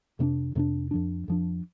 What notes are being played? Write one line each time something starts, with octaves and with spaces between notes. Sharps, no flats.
F2 C3 A#3 D4
F2 C3 A#3 D4
F2 F3 D4
F2 F3 D4